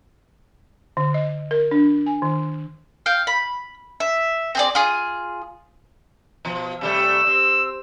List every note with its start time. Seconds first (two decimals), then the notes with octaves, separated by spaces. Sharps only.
0.97 D3
1.14 D#5
1.51 A#4
1.71 D4
2.06 G#5
2.22 D#3
3.06 F5 G5
3.27 B5
4.00 E5
4.55 C4 G#4 D5
4.75 F4 G#4
6.45 B2 F3
6.81 C3 G3 A3 E6
7.27 C4